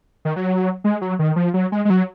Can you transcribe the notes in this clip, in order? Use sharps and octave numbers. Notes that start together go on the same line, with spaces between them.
D#3
F#3
G#3
F#3
D#3
F3
F#3
G#3
G#3
F#3